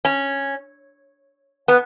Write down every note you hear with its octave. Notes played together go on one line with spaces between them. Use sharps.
C#4
B3